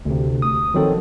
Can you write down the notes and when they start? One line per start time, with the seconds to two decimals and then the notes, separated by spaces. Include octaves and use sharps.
0.05 D2 C3
0.42 D#6
0.74 D#3 F3 F#3 C4 A4